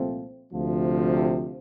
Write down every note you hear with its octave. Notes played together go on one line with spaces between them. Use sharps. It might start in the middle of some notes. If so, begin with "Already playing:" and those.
Already playing: C2 A#2 F3 A3 C4
D2 C3 F3